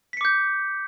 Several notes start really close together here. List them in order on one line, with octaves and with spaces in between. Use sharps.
B6 C#7 D6 G6